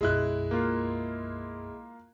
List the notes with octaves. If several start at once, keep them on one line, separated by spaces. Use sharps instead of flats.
B1 F#2 G#3 E4 F#6
A#3 F4